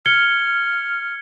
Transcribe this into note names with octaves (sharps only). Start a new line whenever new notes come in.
F6 G#6 C#7 G7